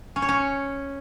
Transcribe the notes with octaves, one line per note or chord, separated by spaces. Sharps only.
C#4
C#5
C#4